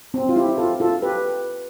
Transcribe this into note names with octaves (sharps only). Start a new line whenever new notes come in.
C4
F4
E4 G4
F4 A4
F4 A4
G4 B4